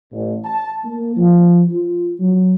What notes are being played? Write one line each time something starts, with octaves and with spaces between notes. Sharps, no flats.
A1
A5
A#3
F3
F4
F#3